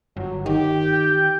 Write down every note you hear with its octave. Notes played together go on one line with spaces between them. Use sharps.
G1 F#3
D#3 G4
G5